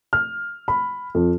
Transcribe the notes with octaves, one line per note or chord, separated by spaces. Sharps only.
F6
B5
F2